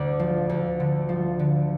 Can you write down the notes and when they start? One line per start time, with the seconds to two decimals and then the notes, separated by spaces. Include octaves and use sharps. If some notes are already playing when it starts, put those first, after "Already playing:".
Already playing: D2 D5
0.19 F3
0.49 D2
0.80 D3
1.09 F3
1.39 D3